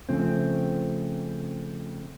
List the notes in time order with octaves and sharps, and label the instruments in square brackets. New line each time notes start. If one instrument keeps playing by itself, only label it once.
[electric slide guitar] C#3 F3 A3 C4